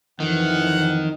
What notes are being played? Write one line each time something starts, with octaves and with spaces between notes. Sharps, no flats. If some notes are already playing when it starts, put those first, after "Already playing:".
F2 D#3 E3 F#5